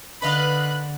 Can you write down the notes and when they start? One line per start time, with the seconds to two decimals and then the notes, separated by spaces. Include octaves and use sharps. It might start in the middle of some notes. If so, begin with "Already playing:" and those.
0.22 D3 B4 D#5 F5 B5 F#6